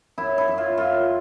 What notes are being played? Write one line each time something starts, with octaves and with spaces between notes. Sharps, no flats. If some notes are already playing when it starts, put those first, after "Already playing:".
F#2 E4
E4
F#2
F4
F#2 F4